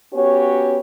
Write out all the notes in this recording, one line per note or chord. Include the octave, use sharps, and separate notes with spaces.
B3 C#4 F#4 G4 C#5